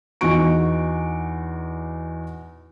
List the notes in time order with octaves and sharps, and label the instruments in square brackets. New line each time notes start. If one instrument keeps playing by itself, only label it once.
[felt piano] E2 D#4 F#4 C#6 D7